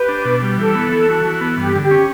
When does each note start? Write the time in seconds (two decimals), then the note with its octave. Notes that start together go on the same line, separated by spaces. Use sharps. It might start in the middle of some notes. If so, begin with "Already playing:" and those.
Already playing: G4 B4
0.08 D4
0.25 B2
0.42 G3
0.58 E3 A4
0.75 B3
0.92 E3
1.09 F#4
1.25 E3
1.41 B3
1.58 G2 G4
1.75 D3
1.83 G4
1.91 C#4